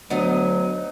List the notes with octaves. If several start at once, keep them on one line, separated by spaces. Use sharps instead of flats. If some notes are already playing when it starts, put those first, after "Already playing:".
D2 F#3 B3 D#4 D#5